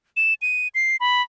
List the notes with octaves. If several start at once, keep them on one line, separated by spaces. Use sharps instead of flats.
E7
D#7
C7
B5